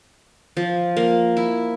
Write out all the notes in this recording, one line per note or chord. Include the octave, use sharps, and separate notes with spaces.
F3
A#3
E4